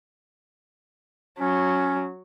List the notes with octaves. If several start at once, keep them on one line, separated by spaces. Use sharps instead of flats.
F#3 C#4